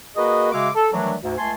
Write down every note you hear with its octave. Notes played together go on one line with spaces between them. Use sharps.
A#3 F#4 G#4 A#4 B4 D#5
C#3 G#3 F#4 E5 F5 D6
A4
D#3 E3 F#3 G3 A3 D4
D2 G#2
C#2 A3 G#5 A5 C6